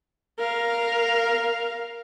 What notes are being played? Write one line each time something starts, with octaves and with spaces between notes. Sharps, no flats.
A#4 F5